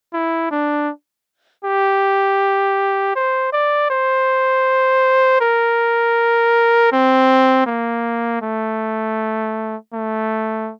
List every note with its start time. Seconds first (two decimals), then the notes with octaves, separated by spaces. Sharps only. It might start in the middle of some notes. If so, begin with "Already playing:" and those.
0.13 E4
0.51 D4
1.65 G4
3.15 C5
3.53 D5
3.90 C5
5.41 A#4
6.92 C4
7.66 A#3
8.42 A3
9.93 A3